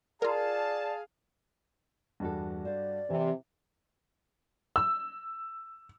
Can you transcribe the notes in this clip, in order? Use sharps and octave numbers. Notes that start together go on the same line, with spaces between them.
F4 G#4 A#4 D5 F5 A5
E2 G2 D4 F#4 A4
C5 D5 F5
C3 E3
E6